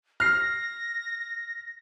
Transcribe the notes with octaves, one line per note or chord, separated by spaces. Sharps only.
F6 A#6 C7